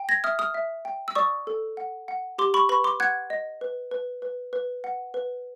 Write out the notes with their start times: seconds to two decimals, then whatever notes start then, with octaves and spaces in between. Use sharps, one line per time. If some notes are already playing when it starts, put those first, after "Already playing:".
Already playing: G5
0.09 G#6 A#6
0.24 E5 D#6 F6
0.39 D#6 F6
0.54 E5
0.85 G5
1.08 E6
1.15 D5 C#6 D#6
1.47 A4
1.77 F#5
2.08 F#5
2.38 G4 C6 D6
2.54 B5 C#6
2.69 B4 B5 C#6
2.84 C6 D6
3.00 F#5 F#6 G#6
3.30 D#5
3.61 B4
3.91 B4
4.22 B4
4.53 B4
4.84 F#5
5.14 B4